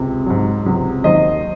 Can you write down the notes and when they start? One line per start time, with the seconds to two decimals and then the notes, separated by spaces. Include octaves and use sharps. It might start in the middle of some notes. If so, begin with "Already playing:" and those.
Already playing: C#2 C3
0.26 G#2 F#3
0.66 C#2 C3 F#3
1.04 D#2 D#3 F#3 C5 D#5